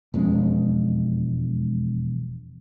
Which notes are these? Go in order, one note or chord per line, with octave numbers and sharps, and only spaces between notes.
E1 F2 G#3 C#4